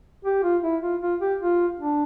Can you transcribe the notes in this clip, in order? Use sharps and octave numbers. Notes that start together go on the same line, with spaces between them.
G4
F4
E4
F4
F4
G4
F4
D4